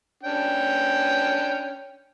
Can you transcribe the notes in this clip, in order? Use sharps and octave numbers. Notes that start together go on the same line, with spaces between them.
C#4 D4 G5